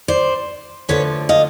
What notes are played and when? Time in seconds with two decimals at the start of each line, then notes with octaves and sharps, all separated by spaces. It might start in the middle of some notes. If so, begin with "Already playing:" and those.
0.08 C5 D5
0.89 D2 D3 F3 B4 C#5
1.29 D#5 F5